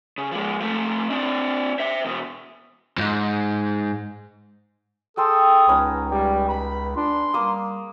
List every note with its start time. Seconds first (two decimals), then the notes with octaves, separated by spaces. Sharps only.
0.18 C#3
0.31 F3 G#3
0.60 F3 A3
1.10 C4 D4
1.80 C5 E5
2.05 E2 B2
2.98 F2 G#2
5.17 G#4 A4 G5 C6 D#6
5.68 C#2 B3 C#4 D#4
6.11 G3
6.49 B5
6.97 D4 C6
7.34 G3 A#3 D6 D#6